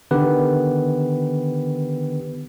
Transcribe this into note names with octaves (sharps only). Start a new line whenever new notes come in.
D3 D#3 B3 G4 B4